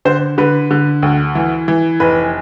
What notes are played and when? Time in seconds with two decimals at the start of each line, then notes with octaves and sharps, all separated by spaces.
0.05 D3 C5
0.38 D3 B4
0.71 D3
1.03 D2
1.35 E3
1.68 E3
2.00 F1 B4